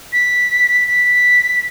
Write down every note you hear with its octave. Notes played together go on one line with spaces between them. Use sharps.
B6
B6